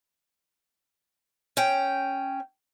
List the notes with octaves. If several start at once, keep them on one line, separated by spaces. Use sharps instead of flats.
C#4 G5